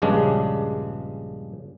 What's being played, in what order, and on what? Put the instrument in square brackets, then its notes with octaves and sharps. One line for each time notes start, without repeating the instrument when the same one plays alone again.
[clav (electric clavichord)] A#1 G2 C#3 G#3 D4